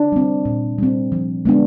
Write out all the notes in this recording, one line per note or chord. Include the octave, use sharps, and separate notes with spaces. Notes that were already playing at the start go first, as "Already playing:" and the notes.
Already playing: D4
G3 C4
A#2
G3 C4
F3
G#3 B3 D4